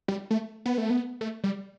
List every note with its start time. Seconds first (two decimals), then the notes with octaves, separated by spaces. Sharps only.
0.08 G3
0.31 A3
0.66 B3
0.78 A3
0.90 B3
1.21 A3
1.44 G3